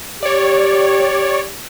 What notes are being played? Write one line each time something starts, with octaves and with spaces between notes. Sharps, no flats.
G4 C#5 D5